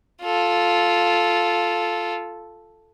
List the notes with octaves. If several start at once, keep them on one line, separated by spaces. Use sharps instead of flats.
F4 A4